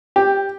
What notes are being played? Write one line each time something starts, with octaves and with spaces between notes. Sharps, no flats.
G4